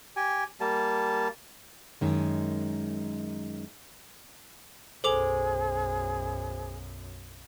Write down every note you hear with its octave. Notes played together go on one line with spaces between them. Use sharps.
G4 G#5
G3 A#3 A5
F#2 D#3 G#3
B1 F#2 G#4 A4 C5 D6 F7